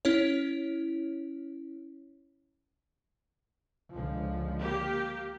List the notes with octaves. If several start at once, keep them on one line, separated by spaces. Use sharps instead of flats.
C#4 E4 C#5
C#2 D3 F3
A#3 G4